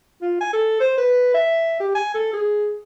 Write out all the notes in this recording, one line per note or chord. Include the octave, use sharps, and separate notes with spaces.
F4
G#5
A4
C5
B4
E5
G4
G#5
A4
G#4